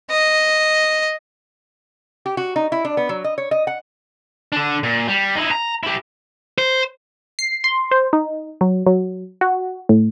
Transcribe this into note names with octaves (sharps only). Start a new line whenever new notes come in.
D#5
G4
F#4
D#4
E4
D4
B3
F#3
D#5
C#5
D#5
F#5
D3 D4
A#2
G3
D#4 E4
A#5
E4 G4
C5
C7
C6
C5
D#4
F#3
F#3
F#4
A2